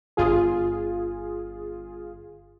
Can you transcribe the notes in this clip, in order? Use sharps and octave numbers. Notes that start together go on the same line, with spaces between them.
G1 F4 G#4